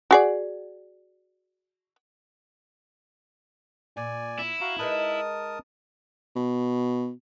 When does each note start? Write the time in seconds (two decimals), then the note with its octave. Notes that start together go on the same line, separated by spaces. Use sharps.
0.11 F#4 G#4 D5
3.97 A#2 D5 G#5
4.39 E4
4.61 F#4 F5 A#5
4.79 G#3 D#4 A#4 B4 A5 D#6
6.36 B2